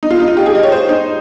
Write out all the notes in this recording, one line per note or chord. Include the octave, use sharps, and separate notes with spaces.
D#4
F4
D#4
F4
G4
G#4
D#5
C#5
C5
D#4